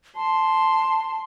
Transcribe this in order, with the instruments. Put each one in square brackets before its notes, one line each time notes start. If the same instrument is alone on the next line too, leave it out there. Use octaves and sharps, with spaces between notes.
[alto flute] A5 [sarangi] C6